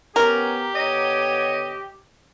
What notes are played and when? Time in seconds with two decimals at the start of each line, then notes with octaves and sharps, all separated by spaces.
0.16 B3 C#4 G4 A#4
0.75 D3 B3 C#5 D#5